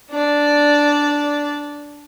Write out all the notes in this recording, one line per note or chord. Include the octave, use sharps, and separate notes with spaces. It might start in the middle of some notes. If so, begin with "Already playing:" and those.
D4 D5